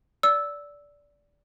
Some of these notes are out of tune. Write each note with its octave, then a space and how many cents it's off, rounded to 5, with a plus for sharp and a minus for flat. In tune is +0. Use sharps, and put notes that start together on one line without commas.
D5 -15 E6 -5